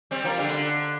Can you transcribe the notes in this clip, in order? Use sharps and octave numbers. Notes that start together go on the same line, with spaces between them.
G3 C4
F3 A#3
D3 G3
D3